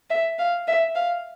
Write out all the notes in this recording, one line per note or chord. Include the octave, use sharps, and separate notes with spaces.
E5
F5
E5
F5